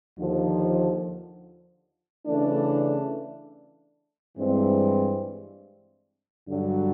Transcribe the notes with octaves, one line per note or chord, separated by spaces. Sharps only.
D#2 D3 F3
C#3 E3 A3 D4
G2 E3 G#3 C4
G2 D3 F#3